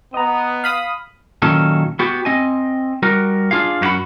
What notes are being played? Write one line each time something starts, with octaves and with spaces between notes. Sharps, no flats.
B3 D#5 A#5
F5 B5 D#6
A#2 D#3 F#3 C#4 A4
B3 F#4 G4
C4 D#5 G#5
G3 F#4 A#4
D4 F4 G#4 F5
F#2 D#4 F#4 A4 F#5 B5